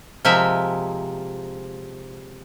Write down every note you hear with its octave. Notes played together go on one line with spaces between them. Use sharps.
C3 F3 G#3 A#4 E5